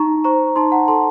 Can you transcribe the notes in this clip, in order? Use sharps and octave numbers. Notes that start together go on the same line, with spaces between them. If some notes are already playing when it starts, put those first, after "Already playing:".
Already playing: D#4 A#5 C#6
C5 A#5 C#6
D#4 A5 C6
F#5 A#5
A4 A5 C6